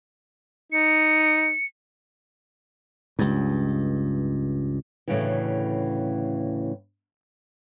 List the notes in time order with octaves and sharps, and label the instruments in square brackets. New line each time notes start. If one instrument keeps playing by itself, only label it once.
[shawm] D#4 [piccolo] C#7
[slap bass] C#2 G2
[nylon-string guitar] D2 A2 C#3 E3